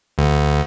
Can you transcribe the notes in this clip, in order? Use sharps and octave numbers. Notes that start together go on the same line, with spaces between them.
D2